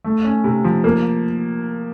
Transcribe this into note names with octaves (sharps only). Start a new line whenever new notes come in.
A3
C#4
C3
F3
A#3